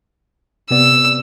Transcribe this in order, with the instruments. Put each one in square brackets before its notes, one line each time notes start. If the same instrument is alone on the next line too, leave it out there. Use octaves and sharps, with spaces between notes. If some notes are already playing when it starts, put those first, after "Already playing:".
[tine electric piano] C3 B3 D5 [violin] E6